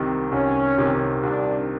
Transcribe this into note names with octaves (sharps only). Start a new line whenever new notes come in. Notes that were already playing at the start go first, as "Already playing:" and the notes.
Already playing: C2 C3 D#3
C2 C#4
C3 D#3
C2 D4